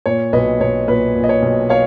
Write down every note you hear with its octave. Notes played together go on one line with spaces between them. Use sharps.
A#2 C#5
B1 B4 D#5
B1 C#5
A#2 B4
A#2
D#5
C#5
B1
C#5 F5